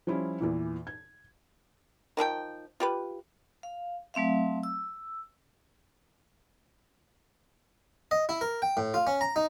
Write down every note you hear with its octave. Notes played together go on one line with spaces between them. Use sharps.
F3 G3 C#4 E4 F4
E2 A#2 E3
G#6
D#3 F3 E4 G5
F4 G4 B4
F5
F#3 A3 C4 E5 F5
E6
D#5
E4
A#4
G5
A2
F4
C#4
A#5
D#4